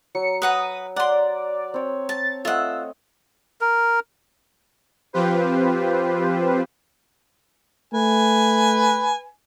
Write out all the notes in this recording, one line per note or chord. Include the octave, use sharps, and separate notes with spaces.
F#3 C#7
B4 F#5 A#5 D#6
D5 F#5 A#5 C6
C4 C#5
A5 A6
A3 F4 D#5 F#5 E6
A#4
F3 C4 F4 G4 B4 C5
A3 B4 G#5